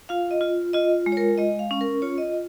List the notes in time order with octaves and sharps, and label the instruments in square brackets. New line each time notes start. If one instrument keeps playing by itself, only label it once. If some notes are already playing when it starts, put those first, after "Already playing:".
[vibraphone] F4 F5
D#5
F4
F4 D#5
G#3
C#5
A#4
G#3 D#5
F5
C#4
A#4
F4 C#5
D#5